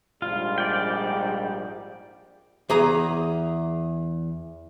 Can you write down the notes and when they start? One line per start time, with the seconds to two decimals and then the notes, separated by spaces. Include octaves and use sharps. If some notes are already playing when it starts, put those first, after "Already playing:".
0.22 A#1 G#2 G3 F4
0.58 D5 G5
2.70 E2 G#4 A#5